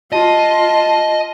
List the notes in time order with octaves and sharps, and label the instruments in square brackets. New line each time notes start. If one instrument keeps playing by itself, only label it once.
[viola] F4 [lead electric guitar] D#5 [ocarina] A5